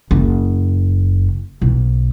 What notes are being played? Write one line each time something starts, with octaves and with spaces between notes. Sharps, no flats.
F#1
B1